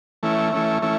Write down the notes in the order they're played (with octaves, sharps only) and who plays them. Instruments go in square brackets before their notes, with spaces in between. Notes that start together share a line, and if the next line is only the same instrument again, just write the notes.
[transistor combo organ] E3 A3 C#4 E4
E3 A3 C#4 E4
E3 A3 C#4 E4